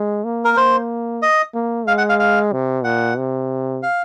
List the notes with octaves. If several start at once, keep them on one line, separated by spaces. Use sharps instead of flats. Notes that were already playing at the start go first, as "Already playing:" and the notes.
Already playing: G#3
A#3
A#4
A#3 C5
D#5
A#3
G#3 F5
F#5
F5
F5
C3
A#2 F#5
C3
F5